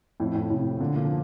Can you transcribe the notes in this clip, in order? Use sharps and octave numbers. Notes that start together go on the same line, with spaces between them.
F2 A2
F2 A2
A2 C3
A#2 D3
A#2 D3
F3